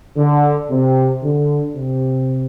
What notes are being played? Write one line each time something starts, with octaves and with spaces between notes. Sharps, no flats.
D3
C3
D3
C3